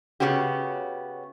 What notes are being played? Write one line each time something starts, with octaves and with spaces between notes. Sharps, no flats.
C#3 B3 C#4 F#4 G4